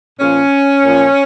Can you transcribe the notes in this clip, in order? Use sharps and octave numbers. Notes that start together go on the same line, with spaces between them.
A#2 F3 C#4
A#2 F3